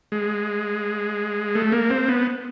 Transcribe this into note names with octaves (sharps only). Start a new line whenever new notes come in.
G#3
A3
A#3
C4
B3